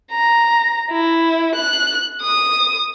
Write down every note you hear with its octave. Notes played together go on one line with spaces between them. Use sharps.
A#5
E4
F#6
D#6